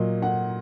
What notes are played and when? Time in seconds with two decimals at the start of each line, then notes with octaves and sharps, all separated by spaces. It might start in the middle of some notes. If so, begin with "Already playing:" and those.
Already playing: A#2 F#3 D#5
0.22 F#5